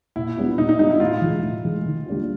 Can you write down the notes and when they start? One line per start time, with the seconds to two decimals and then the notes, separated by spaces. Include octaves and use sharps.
0.16 A#2 E4
0.37 G3 B3 D4 F4
0.58 A#2 D#4
0.69 D#4
0.79 G3 B3 D4 D#4 F4
0.90 E4
1.00 A2 F4
1.22 E3 G#3
1.43 A2
1.65 E3 G#3
1.85 D#3
2.06 G3 A#3 D4 F4